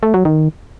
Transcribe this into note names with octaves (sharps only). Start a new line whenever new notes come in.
A3
F#3
D#3